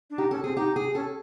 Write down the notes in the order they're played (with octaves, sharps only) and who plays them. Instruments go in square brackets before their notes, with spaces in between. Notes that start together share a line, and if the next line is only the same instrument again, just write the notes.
[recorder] D4
[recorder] D#4 [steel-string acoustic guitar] G4
[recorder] C#4 [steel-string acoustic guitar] A4
[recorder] C4 [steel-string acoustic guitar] G#4
[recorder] D#4 [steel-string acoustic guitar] G4
[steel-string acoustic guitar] G#4
[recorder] C#4 [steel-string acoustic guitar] A4